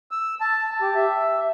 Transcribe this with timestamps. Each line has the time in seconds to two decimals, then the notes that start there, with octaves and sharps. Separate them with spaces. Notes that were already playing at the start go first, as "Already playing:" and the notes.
0.11 E6
0.41 A5
0.81 G4
0.95 E5